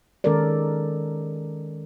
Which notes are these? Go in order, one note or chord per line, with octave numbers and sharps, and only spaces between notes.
D#3 G#3 C#4 A4 A#4 D5